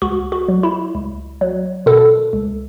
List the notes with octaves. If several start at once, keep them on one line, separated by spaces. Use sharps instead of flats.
C#2 F#4
F#4
F#3
E4
C#2
F#3
B2 A4
C#2